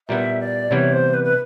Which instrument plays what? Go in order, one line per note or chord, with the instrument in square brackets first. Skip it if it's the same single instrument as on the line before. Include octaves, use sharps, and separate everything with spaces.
[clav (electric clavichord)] A#2 G3 B3 E4 [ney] E5
[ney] D5
[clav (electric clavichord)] C3 E3 G3 B3 [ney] C#5
[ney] C5
B4
B4